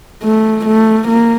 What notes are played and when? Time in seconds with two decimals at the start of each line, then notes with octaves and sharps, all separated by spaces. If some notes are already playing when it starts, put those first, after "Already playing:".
0.23 A3
0.66 A3
1.08 A#3